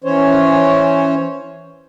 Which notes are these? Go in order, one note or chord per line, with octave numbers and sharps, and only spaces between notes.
E3 C#4 C5 C#5